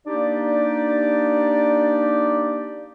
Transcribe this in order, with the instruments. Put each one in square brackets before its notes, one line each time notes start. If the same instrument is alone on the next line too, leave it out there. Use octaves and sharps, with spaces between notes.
[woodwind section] A#3 D4 D#4 G4 D5